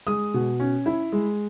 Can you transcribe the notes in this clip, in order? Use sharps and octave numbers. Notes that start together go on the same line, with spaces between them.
G#3 D#6
B2
C#4
E4
G#3